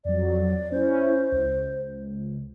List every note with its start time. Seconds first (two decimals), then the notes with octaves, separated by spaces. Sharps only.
0.05 F2 F#3 D5
0.72 C#4 E4 C5
1.32 C#2